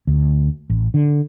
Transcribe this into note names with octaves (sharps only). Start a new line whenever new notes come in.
D2
A1
D3